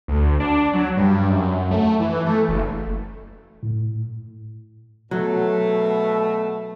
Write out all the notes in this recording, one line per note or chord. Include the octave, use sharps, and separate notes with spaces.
D2
D4
F#3
G2
F#2
A3
E3
A3
F#1
A2
B2 F#3 A3